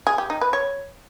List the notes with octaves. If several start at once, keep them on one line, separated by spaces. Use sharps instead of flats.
G#4
G4
D#4
B4
C#5